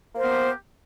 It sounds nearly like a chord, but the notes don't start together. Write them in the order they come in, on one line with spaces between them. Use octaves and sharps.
A#3 C5 A#4 B3 G4